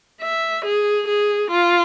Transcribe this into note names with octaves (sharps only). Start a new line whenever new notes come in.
E5
G#4
G#4
F4